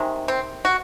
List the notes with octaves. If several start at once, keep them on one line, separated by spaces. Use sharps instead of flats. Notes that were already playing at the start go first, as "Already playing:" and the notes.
Already playing: C3 D#3 G#3
C4
F#4